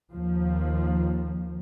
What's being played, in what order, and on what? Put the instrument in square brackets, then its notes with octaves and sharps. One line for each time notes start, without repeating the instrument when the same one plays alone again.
[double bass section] D#2 F3